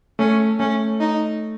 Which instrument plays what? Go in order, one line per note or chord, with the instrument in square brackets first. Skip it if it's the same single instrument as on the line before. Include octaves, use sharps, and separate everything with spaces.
[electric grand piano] A3 [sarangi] C#4
[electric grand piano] A3 [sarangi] C#4
[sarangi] D#4